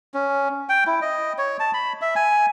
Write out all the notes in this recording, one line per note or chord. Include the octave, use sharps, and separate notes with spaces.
C#4
G5
E4
D#5
C#5
A5
B5
E5
G#5